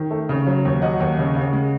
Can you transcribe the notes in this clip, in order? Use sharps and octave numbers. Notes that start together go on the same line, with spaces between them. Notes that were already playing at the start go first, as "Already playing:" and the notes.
Already playing: D#3
A3
C#3
F#3
D#2
F#3 D#5 F#5
D#2
C#3
C#3
G#3